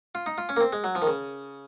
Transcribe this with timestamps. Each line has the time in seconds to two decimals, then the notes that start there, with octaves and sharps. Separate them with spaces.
0.15 F4
0.26 D#4
0.38 F4
0.49 C#4
0.57 A#3
0.61 C4
0.73 G#3
0.84 F#3
0.95 F3
1.02 D#3
1.07 C#3